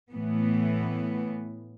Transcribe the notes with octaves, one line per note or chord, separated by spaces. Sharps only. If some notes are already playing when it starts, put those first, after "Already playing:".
A2 E3 B3